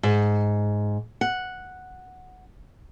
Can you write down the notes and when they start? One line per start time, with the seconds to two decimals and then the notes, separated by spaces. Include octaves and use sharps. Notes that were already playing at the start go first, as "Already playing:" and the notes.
0.03 G#2
1.21 F#5